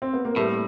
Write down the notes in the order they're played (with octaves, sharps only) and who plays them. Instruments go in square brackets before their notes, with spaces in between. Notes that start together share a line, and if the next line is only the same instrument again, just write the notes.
[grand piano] C4
B3
A#3
[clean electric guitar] A2 [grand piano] G3 A3